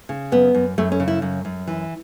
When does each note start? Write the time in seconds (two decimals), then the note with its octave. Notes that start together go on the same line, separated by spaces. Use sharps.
0.09 C#3
0.32 F#2 B3
0.54 F#2
0.78 F#2 A3
0.92 C#4
1.00 C#3
1.08 E4
1.22 F#2
1.45 F#2
1.67 E3